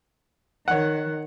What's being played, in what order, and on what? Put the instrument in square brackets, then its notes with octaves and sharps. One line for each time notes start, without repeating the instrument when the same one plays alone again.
[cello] D#3 [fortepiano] C#5 F#5